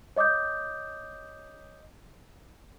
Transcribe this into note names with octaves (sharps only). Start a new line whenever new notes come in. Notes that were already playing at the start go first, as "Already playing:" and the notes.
C#5 D#5 D6 D#6 G6